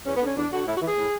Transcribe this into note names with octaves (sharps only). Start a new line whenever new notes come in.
E2 C#4
B3
D3 C#4
E2 D4
D3 F#4
A2 E4
F#4
E3
G#4
A2